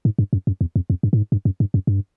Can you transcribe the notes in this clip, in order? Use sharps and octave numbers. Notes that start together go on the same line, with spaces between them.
G#2
G2
F#2
F#2
E2
F2
F2
G2
A2
G#2
G2
F#2
G2
F#2
G2